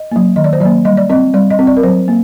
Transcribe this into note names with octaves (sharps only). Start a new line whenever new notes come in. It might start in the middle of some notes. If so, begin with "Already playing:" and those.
Already playing: D#5
F#3 A#3
D#3 D#5
D5
C5
F#3 A#3 D5
G3 D#5
D5
C4 D#5
G3 D5
D#5
C4
D5
A#4
F#3 C5
A#3